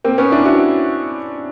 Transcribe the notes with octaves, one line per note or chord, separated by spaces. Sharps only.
A#3 C4
B3 C#4
D4 E4
E4 F#4